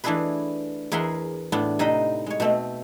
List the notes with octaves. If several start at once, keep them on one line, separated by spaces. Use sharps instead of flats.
E3 A3 D4 E4 G#4 B4
E2 G#4 A#4 E5 F#5 C6
A2 B3 D4
C3 D#4 B4 C5 D#5 B5
G#3 C#5
B2 A3 C4